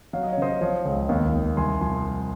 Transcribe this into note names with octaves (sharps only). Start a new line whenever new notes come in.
F#3 F5
D#5
C#5
C#3 C5 D#5
F3 C#5 F5
C#2
D#2
D#2
C2 G#5 C6
F3 G#5 C6